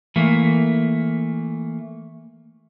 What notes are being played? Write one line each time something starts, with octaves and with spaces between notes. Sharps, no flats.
E3 A3 A#3